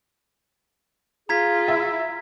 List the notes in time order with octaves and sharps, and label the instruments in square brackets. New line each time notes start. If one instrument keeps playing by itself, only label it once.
[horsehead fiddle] F4 [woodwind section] G#4 [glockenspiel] A#5 G#6 B6
[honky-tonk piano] E5